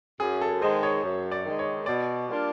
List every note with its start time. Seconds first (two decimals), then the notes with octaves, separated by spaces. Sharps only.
0.20 F#2 G#4
0.41 A4
0.62 D#3 G#3 C5
0.83 C#5
1.04 F#2
1.32 D5
1.45 D#3 G#3
1.59 C#5
1.86 B2 D5
2.29 G3 A#3 D4 F4